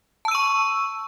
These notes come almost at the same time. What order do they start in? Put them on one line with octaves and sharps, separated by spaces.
A5 E6 D#7 C#6